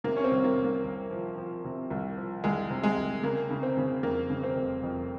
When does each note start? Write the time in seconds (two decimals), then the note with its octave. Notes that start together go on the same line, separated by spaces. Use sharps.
0.04 C3 A#3
0.16 C#4
0.24 C4
0.31 C2
0.44 A#3
0.57 C2
0.64 A#3
0.84 C2
1.10 F3
1.37 F3
1.64 C3
1.90 C2
2.17 F3
2.44 C2 G#3
2.70 C3
2.83 G#3
2.96 C2
3.23 C#3 A#3
3.50 C#3
3.63 C4
3.77 C#3
4.03 F2 A#3
4.30 C#3
4.44 C4
4.56 F1
4.83 F2